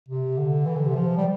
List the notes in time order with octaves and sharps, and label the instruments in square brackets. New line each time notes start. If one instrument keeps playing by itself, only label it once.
[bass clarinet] C3
D3
E3
D3
C3
F3
G3